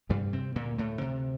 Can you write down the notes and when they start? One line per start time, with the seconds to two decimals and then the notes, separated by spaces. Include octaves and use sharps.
0.09 G2 C3 G3
0.33 C3 C4
0.55 D2 A#2 A#3
0.78 A2 A3
1.01 C3